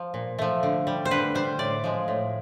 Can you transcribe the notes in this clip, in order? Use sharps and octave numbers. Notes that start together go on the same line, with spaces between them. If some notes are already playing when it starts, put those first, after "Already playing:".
Already playing: F3
A#2
F3 A3
D3
G3
C5
D3 B4
G3 C5
A2 D5
F3 G#3
A2